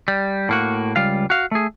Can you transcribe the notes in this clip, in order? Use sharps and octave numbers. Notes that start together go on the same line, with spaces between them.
G3
A2 A#3 F#4
C#2 G3 F4 F5
F#4 F5
A3 G#4